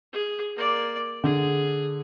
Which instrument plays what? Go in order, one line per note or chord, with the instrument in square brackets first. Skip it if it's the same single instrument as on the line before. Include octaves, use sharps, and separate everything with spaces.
[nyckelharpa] G#4
A#3 D5
[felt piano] D3 [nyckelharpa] G#4